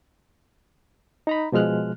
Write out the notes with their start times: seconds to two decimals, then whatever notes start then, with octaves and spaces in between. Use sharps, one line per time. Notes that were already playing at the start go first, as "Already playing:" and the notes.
1.27 D#4 A#5 B5
1.52 B2 F3 G#3 F6 F#6